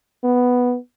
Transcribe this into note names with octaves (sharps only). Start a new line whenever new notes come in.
B3